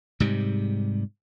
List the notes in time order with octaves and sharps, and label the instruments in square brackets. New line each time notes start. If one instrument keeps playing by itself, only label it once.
[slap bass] G#2 C3 G3